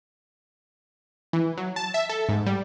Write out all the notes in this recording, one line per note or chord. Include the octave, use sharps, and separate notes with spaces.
E3
F#3
A5
E5
A4
G#2
G3